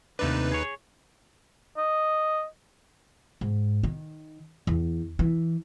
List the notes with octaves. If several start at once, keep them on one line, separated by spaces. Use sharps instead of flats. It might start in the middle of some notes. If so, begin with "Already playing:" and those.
D#2 C3 A3 D4 D#4 B4
G#4 C#5
D#5
G#2
D#3
E2
E3